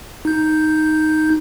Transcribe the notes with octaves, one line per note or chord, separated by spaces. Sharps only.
D#4 G6